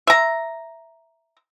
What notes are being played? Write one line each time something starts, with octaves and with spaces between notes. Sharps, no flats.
E5 A#5